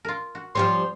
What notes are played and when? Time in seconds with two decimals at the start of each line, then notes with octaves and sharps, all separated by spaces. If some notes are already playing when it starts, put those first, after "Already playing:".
0.05 F4 A#4
0.35 F#4
0.55 F3 G3 C4 C#4 F4 C6